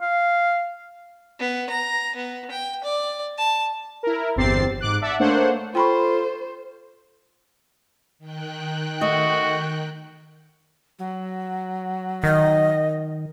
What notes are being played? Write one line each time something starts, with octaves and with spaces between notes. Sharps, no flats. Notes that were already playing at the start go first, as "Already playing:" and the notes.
F5
B3
A#5
B3
G5
D5
A5
E4 A#4
G1 E2 C4 G4 A6 C7
G#2 D6 F#6
D5 E5 F#5 A5
A3 A#3 D4 C5 C#5 F#5
F4 A4 C5 G5 B5 C#6
D#3 G5 F#6
A3 F#4 D#5
F#3
D#3 D#5